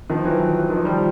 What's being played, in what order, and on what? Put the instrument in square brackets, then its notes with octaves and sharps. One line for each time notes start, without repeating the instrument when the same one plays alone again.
[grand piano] D#3 F3
E3 F#3
D#3 F3
F3 G3